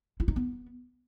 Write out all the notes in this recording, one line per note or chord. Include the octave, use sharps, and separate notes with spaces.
E4
D#4
B3